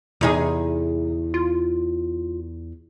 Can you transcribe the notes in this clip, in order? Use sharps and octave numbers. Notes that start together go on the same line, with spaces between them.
E2 C3 D#4 G#4
F4